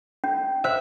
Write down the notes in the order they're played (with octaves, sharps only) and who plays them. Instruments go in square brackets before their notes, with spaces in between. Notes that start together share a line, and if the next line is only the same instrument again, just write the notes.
[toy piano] C#4
[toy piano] C5 [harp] E5